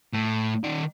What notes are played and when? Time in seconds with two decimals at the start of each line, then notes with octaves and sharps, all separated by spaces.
0.13 A2
0.64 D#3 D5